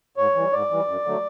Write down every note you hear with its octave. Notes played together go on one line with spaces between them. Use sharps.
G#2 C#5
E3 G3
G#2 D5
E3 G3
F#2
D3 F#3 A3